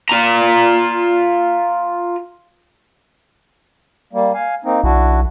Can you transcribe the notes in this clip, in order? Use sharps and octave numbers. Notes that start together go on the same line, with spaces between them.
F4 A#5
G3 A#3
F5 G#5
A#3 C4 D#4
B1 D4 E4 F#4